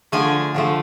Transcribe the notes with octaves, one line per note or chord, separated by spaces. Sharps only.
D3 F3 A3 G#5
D3 F3 A3